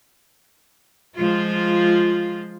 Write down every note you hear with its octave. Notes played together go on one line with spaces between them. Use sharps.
F3 G#3 F4